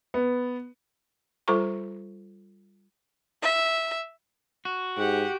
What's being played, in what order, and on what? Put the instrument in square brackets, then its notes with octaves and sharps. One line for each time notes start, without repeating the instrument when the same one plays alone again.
[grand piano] B3
[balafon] G3 F4 A4 C5 A#5 C#6
[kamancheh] E5
[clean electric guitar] F#4
[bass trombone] G#2 [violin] G4 [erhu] F#5